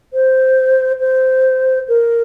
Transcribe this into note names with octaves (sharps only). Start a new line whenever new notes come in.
C5
C5
A#4